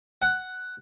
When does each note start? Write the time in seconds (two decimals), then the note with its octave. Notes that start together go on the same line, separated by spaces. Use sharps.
0.22 F#5